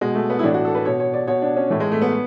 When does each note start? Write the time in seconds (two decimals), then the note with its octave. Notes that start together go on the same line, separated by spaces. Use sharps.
0.01 B2 G#3
0.15 A3
0.30 B3
0.39 E4
0.44 A2 E3 D4
0.54 F#4
0.65 A4
0.75 B4
0.85 B2 C#5
1.00 C#5
1.14 D5
1.28 B2 C#5
1.42 D4
1.57 C#4
1.70 A2 E3 A3
1.80 G#3
1.92 A3
2.02 B3